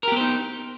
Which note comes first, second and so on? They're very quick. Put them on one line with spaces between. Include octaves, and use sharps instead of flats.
A#4 G4 B3 C5 D#4